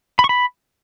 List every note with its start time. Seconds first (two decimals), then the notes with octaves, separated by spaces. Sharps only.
0.19 B5
0.24 C#6
0.29 B5